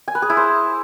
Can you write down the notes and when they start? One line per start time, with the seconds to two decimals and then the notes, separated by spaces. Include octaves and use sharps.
0.08 G#5
0.15 B4
0.22 G#4
0.30 E4
0.37 C5